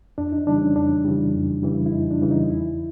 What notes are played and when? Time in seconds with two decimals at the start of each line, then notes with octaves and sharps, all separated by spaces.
0.18 F2 D4
0.32 D#4
0.47 C#3 E3 G3 D4
0.61 C#4
0.76 F2 D4
1.05 C#3 E3 G3
1.34 F2
1.63 C#3 E3 G3
1.86 E4
1.92 F2 D#4
2.11 D4
2.21 C#3 E3 G3
2.31 D#4
2.49 E2 E4